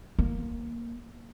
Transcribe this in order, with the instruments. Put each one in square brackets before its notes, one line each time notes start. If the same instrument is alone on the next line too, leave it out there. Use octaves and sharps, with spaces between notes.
[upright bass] A#3